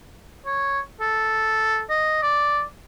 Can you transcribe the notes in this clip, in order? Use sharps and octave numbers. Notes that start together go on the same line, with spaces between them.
C#5
A4
D#5
D5